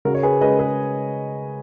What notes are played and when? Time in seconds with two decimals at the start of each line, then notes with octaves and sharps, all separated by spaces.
0.05 C#3 F#4 A#4
0.15 C#5
0.23 G#4 B4
0.41 G#3 C#4 B4 D#5
0.59 G#4 B4